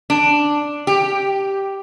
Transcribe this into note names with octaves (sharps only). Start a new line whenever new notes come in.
D4
G4